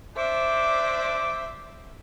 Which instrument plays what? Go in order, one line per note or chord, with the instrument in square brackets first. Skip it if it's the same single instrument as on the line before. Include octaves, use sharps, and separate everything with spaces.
[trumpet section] D4 D6 [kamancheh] C5 E5